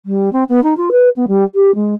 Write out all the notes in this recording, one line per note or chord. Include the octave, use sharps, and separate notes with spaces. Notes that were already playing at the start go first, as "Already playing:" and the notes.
G3
C4
B3
D#4
F4
B4
B3
G3
G4
G#3